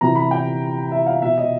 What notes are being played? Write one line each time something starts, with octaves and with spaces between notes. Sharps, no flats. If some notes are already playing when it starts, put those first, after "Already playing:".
C3 E3 A#5
B5
G5
E5
F5
B2 E5
D#5